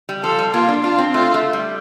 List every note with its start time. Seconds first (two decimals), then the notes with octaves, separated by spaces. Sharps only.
0.09 G3
0.23 F3 A4
0.39 G3
0.53 A#3 F4
0.69 D4
0.83 D4 F4
0.98 C4
1.13 A3 F4
1.34 A3
1.53 G3